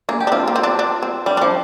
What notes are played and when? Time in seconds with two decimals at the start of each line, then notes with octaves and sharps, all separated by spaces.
0.09 A#3 G#4
0.20 G4
0.27 D4
0.32 C4 F4
0.48 A#3
0.56 C4
0.63 D4
0.79 D4
1.03 C4
1.26 G3 D4
1.37 D4
1.42 F3